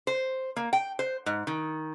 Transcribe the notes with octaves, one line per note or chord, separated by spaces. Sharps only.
C5
A#3
G5
C5
G#2
D#3